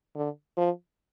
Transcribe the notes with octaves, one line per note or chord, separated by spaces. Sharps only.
D3
F3